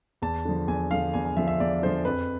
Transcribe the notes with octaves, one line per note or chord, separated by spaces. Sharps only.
E2 A5
D3 F3
E2 G#5
D3 F3 F5
E2 G#5
G#5
D3 F3 E5
E5
E2 D5
D3 F3 C5
F2 B4